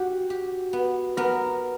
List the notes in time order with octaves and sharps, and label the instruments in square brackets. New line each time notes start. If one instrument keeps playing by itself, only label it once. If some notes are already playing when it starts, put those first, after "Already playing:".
Already playing: [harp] F#4 [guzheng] G4
[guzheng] G4
B3
[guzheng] B3 [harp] A#4